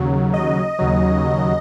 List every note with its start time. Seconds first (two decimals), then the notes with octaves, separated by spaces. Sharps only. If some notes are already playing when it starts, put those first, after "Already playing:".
Already playing: D#2 C#3 F#3
0.34 D#5
0.79 D#2 C#3 F#3